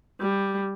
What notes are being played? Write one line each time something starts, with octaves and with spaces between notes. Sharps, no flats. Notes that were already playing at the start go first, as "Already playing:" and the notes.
G3